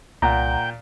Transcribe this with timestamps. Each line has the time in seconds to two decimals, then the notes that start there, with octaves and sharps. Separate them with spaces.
0.22 C2 A#2 F#5 G5 A#5